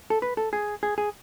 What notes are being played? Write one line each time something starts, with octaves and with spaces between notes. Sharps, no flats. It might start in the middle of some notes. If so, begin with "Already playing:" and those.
A4
B4
A4
G#4
G#4
G#4